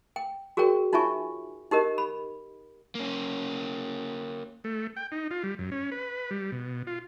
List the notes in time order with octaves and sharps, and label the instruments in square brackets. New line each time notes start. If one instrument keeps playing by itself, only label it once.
[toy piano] G5
F#4 G#4 A#4 C#5 G5
D#4 F4 C#5 E5 G#5 C#6
D#4 G4 A#4 D#5
B5
[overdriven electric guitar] A#3 C#4
[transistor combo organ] A3
G5
D#4
F4
G3
F#2
C#4
B4
G3
B2
F4